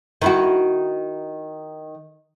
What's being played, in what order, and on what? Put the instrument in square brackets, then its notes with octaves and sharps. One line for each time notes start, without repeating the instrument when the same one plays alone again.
[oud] D#3 E4 F#4